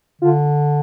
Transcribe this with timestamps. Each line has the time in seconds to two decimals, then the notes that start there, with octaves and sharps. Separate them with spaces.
0.22 D3 F4